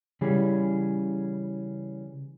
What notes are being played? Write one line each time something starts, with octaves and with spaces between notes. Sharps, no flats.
C#3 E3 G3 C#4 G#4